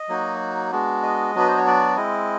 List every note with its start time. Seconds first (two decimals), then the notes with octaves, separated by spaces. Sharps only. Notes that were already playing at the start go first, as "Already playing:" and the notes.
Already playing: D#5
0.08 F#3 A#3 D#4 F#4
0.71 G#3 B3 D4 F#4
1.03 D#5
1.34 F#3 B3 D4 F#4 B4
1.48 C5
1.57 C#5
1.66 D5
1.97 G#3 C4 E4 D#5